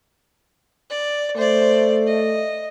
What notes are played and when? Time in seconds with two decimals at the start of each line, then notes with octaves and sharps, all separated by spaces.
0.90 D5
1.36 A3 C5 D5
2.07 D#5